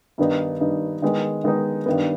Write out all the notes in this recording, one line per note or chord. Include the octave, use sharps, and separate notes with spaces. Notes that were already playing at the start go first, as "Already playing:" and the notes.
G2 D#3 B3 D#4
G2 D#3 B3 D#4
D#3 G#3 B3 D#4
D#3 G#3 B3 D#4
G2 D#3 B3